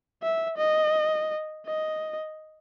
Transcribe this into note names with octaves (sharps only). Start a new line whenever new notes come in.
E5
D#5
D#5